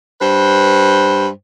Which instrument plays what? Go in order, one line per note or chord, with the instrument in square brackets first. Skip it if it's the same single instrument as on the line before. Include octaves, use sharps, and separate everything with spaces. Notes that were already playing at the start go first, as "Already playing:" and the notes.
[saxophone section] G2 B4 C5